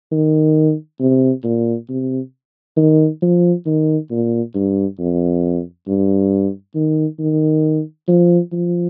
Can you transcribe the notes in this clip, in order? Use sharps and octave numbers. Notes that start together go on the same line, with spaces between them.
D#3
C3
A#2
C3
D#3
F3
D#3
A#2
G2
F2
G2
D#3
D#3
F3
F3